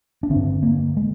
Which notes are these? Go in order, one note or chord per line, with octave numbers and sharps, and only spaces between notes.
D4
D3 C4
G2
A#3
G#3